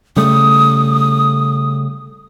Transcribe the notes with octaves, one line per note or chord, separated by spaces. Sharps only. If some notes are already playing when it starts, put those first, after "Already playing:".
C#3 G3 A3 D#6